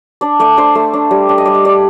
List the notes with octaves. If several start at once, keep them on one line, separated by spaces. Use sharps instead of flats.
D4 D5
A3 D5
D4 C5
A3
D4
G3
D4
D#5
G3 D5
D#5
D4 D5